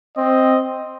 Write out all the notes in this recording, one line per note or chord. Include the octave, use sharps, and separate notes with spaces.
C4 D#5